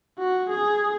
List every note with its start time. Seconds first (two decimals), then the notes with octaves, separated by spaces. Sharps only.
0.19 F#4
0.49 G#4